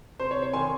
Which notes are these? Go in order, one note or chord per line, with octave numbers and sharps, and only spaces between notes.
C3 C5
C#5
C3
C#5
D#3 G#5 C6